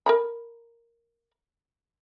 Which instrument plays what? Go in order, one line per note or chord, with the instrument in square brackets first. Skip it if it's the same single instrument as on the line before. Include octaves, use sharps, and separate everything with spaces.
[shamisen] A#4 A#5 B5